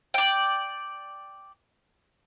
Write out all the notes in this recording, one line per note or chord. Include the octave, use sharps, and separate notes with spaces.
D5 G5